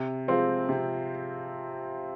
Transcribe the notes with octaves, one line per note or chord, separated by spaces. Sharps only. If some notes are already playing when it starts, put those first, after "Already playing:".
Already playing: C3
F3 G#3 C4 F4
C3